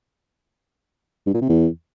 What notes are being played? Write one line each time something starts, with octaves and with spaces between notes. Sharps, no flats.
G2
A#2
C3
E2